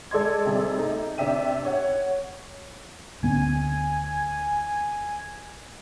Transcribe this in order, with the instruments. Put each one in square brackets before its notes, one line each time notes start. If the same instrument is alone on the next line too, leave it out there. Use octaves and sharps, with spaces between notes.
[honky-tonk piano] G#3 A4 D5 D#5 C6 G#6
C3 G3 G#4
A3 D#4
C3 D4 E5 G5 D#7
C#5 F#5
[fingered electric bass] D2 B3 C#4 [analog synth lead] G#5